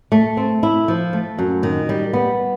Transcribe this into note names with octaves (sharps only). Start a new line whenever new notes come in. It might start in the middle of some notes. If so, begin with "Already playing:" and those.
A3
C4
E4
F3
A3
F#2
D#3
G3
B3